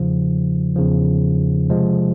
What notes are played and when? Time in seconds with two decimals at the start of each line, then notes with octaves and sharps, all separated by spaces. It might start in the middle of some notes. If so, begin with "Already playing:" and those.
Already playing: E2 C#3 F3
0.76 E2 C#3 F3
1.70 C3 F3 G#3